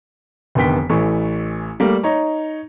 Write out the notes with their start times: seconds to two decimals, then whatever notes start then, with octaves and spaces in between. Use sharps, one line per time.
0.55 F1 D3 D#3 B3 G5 B6
0.90 A1 E3 A3 C#6
1.80 G3 A3 A#3
2.03 D#4 C#5 A#5